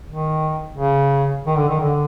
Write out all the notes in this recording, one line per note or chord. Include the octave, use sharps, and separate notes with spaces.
D#3
C#3
D#3
D3
D#3
D3